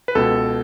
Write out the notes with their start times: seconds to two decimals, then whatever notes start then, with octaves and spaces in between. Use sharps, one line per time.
0.08 B4
0.15 C#2 B2 A4